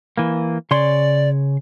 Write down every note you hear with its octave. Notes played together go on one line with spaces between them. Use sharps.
E3 A#3
C#3 C#5 D5 C6